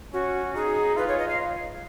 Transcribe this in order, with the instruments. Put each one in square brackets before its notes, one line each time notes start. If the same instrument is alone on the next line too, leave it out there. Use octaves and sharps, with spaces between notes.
[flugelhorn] C#4 [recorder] F#4
[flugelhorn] D#4 [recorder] G#4
[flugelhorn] F4 [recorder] B4
[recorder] C#5
D#5
F5